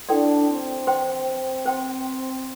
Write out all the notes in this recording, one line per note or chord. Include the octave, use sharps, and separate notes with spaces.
D4 E4 A4 D5 G5 C6
C4
C5 G5 C6
C5 G5 C6